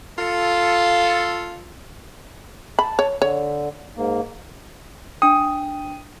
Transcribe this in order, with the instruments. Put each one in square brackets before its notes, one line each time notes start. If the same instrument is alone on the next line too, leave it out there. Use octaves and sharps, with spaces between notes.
[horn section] F4 A4
[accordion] A5 [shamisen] B5
[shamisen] C#5
[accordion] D3 [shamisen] C#5
[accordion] G#2 A#3
[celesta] D4 G5 [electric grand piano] D#6